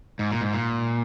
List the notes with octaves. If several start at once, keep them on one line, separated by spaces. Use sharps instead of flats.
G#2
A#2
G#2
A#2